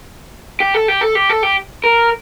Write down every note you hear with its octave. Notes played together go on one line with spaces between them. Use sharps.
G4
A4
G4
A4
G4
A4
G4
A#4